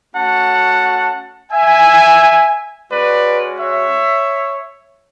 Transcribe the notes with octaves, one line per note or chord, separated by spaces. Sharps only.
A3 C#4 F#4 F#5 A5
E5 G#5
G#3 C#4 F#4 B4 D5
C#5 E5